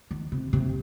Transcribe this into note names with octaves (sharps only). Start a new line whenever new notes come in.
D#3
C3
C3